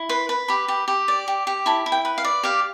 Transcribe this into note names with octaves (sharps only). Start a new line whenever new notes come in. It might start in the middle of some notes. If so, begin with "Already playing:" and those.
Already playing: E4
B4 C6
B4
G4 B5
G4
G4
D5
G4
G4
E4 A5
E4
G5
B4
F5
D5
G4 F5